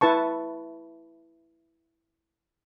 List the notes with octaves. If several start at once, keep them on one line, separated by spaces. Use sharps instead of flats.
E4 B4 A5 C#6